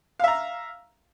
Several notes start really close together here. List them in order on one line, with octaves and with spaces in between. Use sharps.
F5 E5 A#5